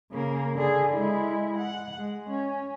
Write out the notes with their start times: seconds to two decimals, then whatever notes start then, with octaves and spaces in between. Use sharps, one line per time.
0.12 C#3 A#3
0.55 D3 G#4
0.93 G#3 E4
1.57 F#5
1.97 G#3
2.30 C#4